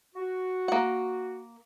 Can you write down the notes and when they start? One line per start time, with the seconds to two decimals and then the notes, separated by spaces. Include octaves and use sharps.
0.14 F#4
0.68 A#3 F#5